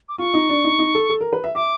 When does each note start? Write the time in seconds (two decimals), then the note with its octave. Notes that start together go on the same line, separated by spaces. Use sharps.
0.09 D6
0.18 F4 C#6
0.34 D#4
0.49 D4
0.64 D#4
0.79 D#4
0.95 A4
1.10 A4
1.21 A#4
1.33 B4
1.44 E5
1.55 E5 D6